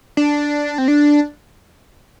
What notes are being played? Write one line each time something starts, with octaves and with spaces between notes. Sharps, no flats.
D4
C4
D4